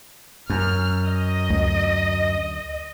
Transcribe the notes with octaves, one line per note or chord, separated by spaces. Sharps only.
F#2 F6
D#5
D2